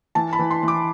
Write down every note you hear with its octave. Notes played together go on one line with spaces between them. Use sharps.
E3 A5
B5
E3
C6
E3
D6